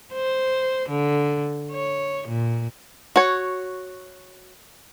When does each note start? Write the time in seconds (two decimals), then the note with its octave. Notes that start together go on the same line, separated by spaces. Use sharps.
0.13 C5
0.89 D3
1.71 C#5
2.28 A#2
3.16 F#4 C#5